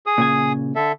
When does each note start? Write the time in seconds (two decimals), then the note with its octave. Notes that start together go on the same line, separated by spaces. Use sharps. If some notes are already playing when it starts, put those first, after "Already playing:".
0.06 G#4 D#6
0.18 A#2 C#3 G#5
0.76 D3 A4 E5